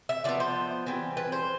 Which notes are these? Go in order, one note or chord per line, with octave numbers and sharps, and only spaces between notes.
E5
D3 F3 B3 D5
C5
E3 G3 C4
B4
C5